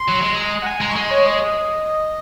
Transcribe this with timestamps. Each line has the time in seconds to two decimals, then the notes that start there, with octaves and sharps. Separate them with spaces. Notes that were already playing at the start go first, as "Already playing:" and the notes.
Already playing: C6
0.08 F#3
0.22 G#3
0.37 A#5
0.62 F#5
0.66 G#5
0.81 G#3 A#5
0.90 C#6
0.96 G#3 C6
1.11 C#5
1.26 D#5